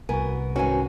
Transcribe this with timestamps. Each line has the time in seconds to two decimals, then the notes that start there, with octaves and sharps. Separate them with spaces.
0.09 C2 B3 F#4 A#4 G#5
0.56 G#2 D#3 C#4 F#4 B4 G#5